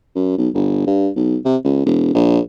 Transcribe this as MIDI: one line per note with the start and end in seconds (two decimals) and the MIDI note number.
0.16 0.38 42
0.38 0.49 35
0.54 0.85 31
0.87 1.09 43
1.16 1.37 35
1.45 1.57 48
1.64 1.84 37
1.86 2.10 28
2.15 2.39 34